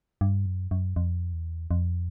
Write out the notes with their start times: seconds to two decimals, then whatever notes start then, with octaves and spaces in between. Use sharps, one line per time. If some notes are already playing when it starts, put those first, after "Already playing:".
0.21 G2
0.46 F#2
0.71 F#2
0.96 F2
1.33 E2
1.71 F2